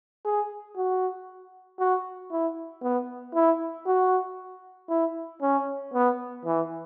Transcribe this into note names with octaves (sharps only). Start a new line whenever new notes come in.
G#4
F#4
F#4
E4
B3
E4
F#4
E4
C#4
B3
E3